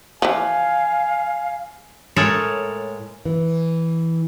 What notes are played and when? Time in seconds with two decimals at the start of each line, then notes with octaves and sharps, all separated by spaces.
0.22 E3 F3 F5 G#5
2.16 A2 G#3 A4 A#4 C#5 A#5
3.25 E3